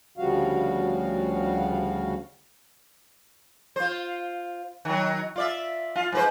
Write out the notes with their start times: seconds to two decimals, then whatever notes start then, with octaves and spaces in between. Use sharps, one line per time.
0.18 D2 C#3 F3 G3 F#4 F5
3.76 F4 C5
4.85 D#3 F#3
5.36 F4 D5 E5
5.96 F4
6.12 G#2 B4 C5